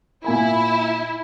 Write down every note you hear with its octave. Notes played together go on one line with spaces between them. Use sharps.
A#2 E4 G#5 B5